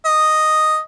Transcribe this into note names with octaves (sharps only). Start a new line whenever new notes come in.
D#5